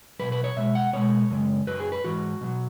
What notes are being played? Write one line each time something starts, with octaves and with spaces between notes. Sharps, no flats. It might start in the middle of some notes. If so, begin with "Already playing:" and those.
B2 F#3 B4
B4
C#5
B2 G#3 E5
F#5
B2 G#3 C#5
F#2 C#3 G#3
F#2 F#3 B4
G#4
B4
G#2 E3 F#4
B2 F#3